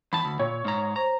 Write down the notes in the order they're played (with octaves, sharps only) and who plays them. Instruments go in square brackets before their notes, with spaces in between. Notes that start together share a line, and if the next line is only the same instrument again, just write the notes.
[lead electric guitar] E2 A5 [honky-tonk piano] B5
[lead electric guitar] D2
[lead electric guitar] A#2 [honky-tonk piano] C#5
[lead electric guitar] G#2 A#5
[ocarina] C5 [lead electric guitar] A#5